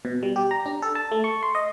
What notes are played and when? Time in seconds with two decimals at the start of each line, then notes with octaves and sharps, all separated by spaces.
0.05 B2
0.23 G3
0.36 G4
0.51 A#5
0.66 D4
0.82 A4
0.95 A5
1.12 A3
1.24 C#6
1.43 C6
1.55 D#5